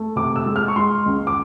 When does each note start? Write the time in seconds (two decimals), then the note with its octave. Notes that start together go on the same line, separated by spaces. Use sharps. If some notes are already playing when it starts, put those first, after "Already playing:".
Already playing: A3
0.16 C3 D6
0.36 E6
0.46 G#3
0.56 F6
0.68 C#6
0.76 G#3 C6
1.06 C#2
1.27 D6